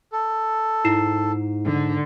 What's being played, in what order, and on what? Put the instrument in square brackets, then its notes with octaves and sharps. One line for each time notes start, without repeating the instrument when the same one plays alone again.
[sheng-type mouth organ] A4
[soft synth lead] G#2 [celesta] E4 C7 E7
[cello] D3